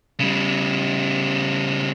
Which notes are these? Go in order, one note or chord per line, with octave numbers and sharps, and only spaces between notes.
C#3 G3